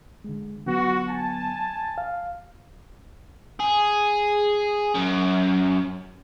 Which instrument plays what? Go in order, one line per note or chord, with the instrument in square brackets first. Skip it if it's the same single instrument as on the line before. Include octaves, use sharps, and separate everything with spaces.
[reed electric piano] D3 G#3
[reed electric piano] D3 F#3 B3 [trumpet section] F4 F#4
[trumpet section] G#5 A5
[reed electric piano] F5
[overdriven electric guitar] G#4
F#2